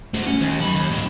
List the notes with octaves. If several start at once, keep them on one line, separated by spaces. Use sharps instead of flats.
A3 F#4
C#4
D#2
F#2 B5
D#2
A2 D4